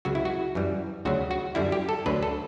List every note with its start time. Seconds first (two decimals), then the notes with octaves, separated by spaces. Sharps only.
0.05 C#2 C#3 F#3 F#4
0.15 E4
0.25 F#4
0.55 F#2 E3 G3
1.05 D2 C#3 F#3 F#4
1.31 F#4
1.55 F#2 D3 G3 E4
1.72 G4
1.89 A4
2.06 D2 D3 F#3 B4
2.23 A4